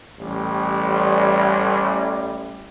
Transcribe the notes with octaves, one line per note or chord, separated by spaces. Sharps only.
A1 G3